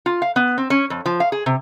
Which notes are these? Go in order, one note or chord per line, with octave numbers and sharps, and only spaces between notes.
F4
F5
B3
C4
C#4
F2
F3
F5
G#4
C3